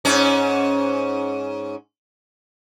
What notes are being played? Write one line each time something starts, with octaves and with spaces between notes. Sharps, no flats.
G#2 C#4